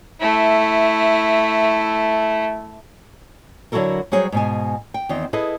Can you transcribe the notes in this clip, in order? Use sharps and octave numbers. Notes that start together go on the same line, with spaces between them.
A3 E4
D3 F#3 E4 F#4 A4 A#4
F#3 G3 F#4 G#4 C5 C#5
G#2 B2 G#5
G5
E2 D#3 C4
E4 G#4 A4 B4 D#5